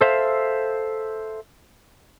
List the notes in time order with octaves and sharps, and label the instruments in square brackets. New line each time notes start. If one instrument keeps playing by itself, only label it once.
[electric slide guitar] A4 C5 E5 F5